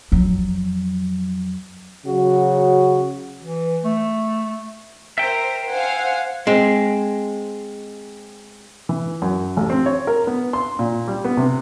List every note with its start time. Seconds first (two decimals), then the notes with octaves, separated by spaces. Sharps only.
0.12 F2 F#3
2.06 C#3 F#3 F#4
3.42 E3
3.84 A3
5.18 A#4 C5 E5 G5
5.70 C5 F5 F#5 G#5
6.47 G#3 C4
8.89 E3
9.22 F#2
9.57 A1
9.70 C4
9.86 C#5
10.07 A#4
10.27 B3
10.53 C6
10.79 A#2
11.08 G3
11.24 B3
11.37 C3